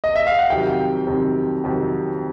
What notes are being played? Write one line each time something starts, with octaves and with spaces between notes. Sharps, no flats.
D#5
E5
F5
F#5
F2 C3 D#3 F#3 G5
F2 C3 D#3 F#3
F2 C3 D#3 F#3